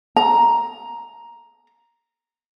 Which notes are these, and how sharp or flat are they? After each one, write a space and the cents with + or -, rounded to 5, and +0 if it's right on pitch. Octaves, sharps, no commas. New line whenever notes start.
A#5 +5